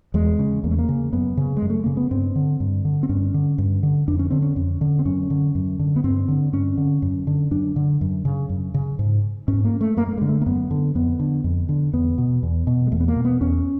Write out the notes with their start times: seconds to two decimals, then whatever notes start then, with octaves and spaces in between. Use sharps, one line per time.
0.14 E2 G#3
0.39 C#3
0.64 E2 A#3
0.71 A3
0.79 A#3
0.89 C#3
1.13 F#2 B3
1.37 C#3
1.57 G#3
1.62 F#2
1.70 A3
1.84 C#3 A#3
1.97 B3
2.11 G2 C4
2.36 D3
2.60 G2
2.85 D3
3.03 C4
3.09 G2 C#4
3.34 D3
3.58 G2
3.83 D3
4.08 F2 D4
4.19 C#4
4.30 D3 C4
4.42 C#4
4.56 F2
4.81 D3
4.99 C4
5.05 F#2 C#4
5.30 D3
5.55 F#2
5.79 D3
5.96 B3
6.04 G2 C4
6.28 D3
6.53 G2 C#4
6.77 D3
7.02 F#2
7.27 D3
7.51 F#2 D4
7.76 D3
8.01 F#2
8.25 C#3
8.49 F#2
8.74 C#3
8.99 G#2
9.48 G#2 C#4
9.64 A#3
9.81 A3
9.97 F#2 A#3
10.08 A3
10.18 D3 G#3
10.29 A3
10.42 A#3
10.46 F#2 B3
10.71 D3
10.95 F2 B3
11.20 D3
11.44 F2
11.69 D3
11.93 E2 B3
12.18 B2
12.43 E2
12.67 B2
12.87 G#3
12.92 E2 A3
13.00 B3
13.08 A#3
13.16 B2
13.25 B3
13.41 E2 C#4